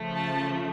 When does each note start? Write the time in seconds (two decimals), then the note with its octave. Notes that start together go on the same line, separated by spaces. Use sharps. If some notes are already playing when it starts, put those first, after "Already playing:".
Already playing: C#3 F3 A3
0.16 A5